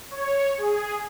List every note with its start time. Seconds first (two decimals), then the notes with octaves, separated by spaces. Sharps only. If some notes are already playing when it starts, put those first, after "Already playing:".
0.11 C#5
0.58 G#4